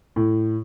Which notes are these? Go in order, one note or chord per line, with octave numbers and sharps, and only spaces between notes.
A2